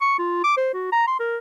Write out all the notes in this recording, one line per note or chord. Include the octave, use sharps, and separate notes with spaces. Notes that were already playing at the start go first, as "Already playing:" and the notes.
C#6
F4
D6
C5
F#4
A#5
C6
A#4